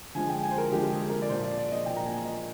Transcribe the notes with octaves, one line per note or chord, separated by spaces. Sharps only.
D3 F3 G#3 G#5
G5
G#5
C5
A#4
D3 F3 G#3 G4
G#4
A#4
D5
A#2 F3 A#3 C5
D5
D5
D#5
A#2 F3 A#3 G5
A#5
G#5
D#5